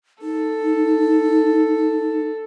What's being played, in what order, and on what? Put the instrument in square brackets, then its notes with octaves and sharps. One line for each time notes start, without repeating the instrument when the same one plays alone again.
[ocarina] D#4 [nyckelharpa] A4